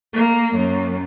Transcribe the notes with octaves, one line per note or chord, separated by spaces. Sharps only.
A#3
F#2